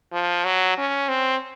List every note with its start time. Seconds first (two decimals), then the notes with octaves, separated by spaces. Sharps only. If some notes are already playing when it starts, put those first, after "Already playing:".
0.13 F3
0.45 F#3
0.78 C#4
1.09 C4